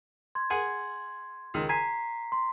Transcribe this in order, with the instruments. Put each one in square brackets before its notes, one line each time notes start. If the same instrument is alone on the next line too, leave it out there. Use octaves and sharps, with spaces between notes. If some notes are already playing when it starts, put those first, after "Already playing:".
[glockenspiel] C6 G#6
[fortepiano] G#4 F#5 G#5
C#2 D#3
[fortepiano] G#5 [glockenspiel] A#5 B6 C7
[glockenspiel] C6